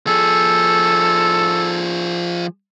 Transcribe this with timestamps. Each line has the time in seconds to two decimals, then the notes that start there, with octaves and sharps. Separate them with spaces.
0.07 F3 G#4 A4